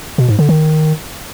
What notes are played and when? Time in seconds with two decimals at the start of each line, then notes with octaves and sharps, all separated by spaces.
0.18 B2
0.29 G#2
0.39 D3
0.49 D#3